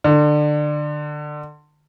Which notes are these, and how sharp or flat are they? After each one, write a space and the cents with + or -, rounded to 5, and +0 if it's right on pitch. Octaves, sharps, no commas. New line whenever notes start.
D3 +25